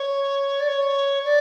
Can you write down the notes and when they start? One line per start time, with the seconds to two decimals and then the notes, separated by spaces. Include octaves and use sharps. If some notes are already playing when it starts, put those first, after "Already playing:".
Already playing: C#5
0.60 D5
0.67 C#5
1.24 D5